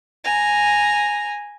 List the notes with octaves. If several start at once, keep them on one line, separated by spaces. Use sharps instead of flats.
G#5 A#5